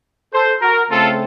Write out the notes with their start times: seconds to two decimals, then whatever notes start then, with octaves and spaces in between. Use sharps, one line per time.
0.33 A4 C5
0.61 F#4 A#4
0.90 C#3 A3 C4 F4 A4